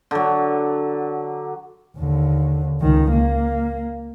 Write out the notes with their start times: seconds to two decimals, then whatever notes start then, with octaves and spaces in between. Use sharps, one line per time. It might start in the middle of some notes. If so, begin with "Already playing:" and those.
0.11 D3 F#3
1.98 D#2 D3
2.81 C#2 D#3
3.11 A#3